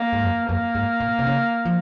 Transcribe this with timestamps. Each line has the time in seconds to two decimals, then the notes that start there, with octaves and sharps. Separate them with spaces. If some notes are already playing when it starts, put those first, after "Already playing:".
Already playing: A#3
0.13 G#2
0.23 F#2
0.49 F#2 A#3
0.75 G#2
1.00 A#2
1.19 C3
1.27 C#3
1.65 F3